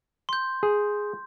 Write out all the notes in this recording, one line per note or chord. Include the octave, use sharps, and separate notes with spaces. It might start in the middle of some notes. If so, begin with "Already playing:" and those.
C6 G6
G#4